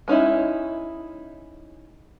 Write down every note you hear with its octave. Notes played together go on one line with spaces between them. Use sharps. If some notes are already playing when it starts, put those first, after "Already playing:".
G#3 C#4 D#4 E4